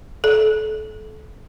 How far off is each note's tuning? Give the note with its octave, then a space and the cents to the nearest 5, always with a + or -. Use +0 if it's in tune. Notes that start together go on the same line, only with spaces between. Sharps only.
A4 -30